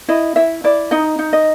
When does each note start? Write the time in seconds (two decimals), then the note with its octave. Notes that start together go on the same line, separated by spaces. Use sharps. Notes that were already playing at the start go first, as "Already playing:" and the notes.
0.08 E4 D#5
0.36 E4 E5
0.64 E4 D5
0.91 D#4 D#5
1.19 D#4
1.33 D#5